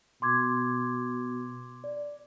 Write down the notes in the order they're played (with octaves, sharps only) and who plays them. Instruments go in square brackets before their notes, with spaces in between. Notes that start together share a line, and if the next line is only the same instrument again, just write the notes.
[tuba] B2 [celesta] C6 D6 G#6
[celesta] D5